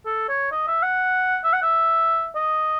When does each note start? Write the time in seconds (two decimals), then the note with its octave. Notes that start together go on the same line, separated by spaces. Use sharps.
0.05 A4
0.29 C#5
0.52 D#5
0.67 E5
0.82 F#5
1.44 E5
1.53 F#5
1.63 E5
2.35 D#5